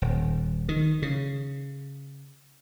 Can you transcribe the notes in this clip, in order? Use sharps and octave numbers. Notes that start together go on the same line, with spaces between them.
D#1
D#3
C#3